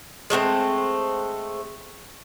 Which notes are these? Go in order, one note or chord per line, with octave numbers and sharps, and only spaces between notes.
G#3 A3 B3 C4